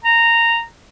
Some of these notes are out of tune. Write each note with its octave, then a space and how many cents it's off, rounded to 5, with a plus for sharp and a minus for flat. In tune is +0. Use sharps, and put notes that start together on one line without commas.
A#5 -10